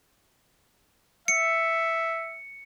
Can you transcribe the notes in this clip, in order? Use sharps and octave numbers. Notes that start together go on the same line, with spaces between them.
E5 C#7